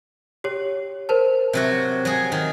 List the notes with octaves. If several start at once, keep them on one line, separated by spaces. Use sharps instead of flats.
G4 C#5
A#4 C5 A5
C3 F#3 F#4
F#3 G#4
D#3